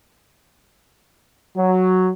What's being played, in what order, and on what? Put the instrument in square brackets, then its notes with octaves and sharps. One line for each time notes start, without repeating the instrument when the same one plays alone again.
[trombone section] F#3